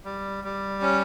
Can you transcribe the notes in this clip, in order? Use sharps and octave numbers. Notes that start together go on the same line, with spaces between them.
G3
G3
C#4